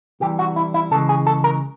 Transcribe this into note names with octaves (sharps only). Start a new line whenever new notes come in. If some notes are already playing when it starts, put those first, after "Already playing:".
C3 E3 G3 G4
F#4
E4
E4
C#3 E3 G#3 A4
G#4
A4
A#4